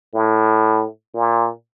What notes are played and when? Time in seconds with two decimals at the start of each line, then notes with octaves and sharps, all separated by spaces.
0.15 A2
1.14 A#2